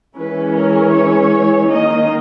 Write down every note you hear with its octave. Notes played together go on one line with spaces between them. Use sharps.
E3 G#3 C#4 E4 B4
A#4
C#5
D#3 A#3 D#4 D#5